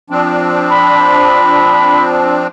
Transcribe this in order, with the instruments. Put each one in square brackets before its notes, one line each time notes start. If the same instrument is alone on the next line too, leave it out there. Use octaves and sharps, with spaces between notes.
[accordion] F3 C4 D4
[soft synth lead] B5